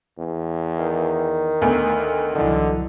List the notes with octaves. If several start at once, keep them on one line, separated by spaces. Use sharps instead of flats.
E2
D#3
D2 B3
C2 D3 E3 F#3 D#4